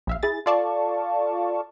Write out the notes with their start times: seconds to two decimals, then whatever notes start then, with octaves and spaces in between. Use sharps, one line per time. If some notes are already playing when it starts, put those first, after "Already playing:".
0.07 A#1 E5 F5
0.23 E4 G#4 A6
0.46 F4 A4 D5 F5 A5 C#6